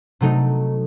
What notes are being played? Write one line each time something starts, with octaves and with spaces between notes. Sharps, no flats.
C3 F#3 A3 D#4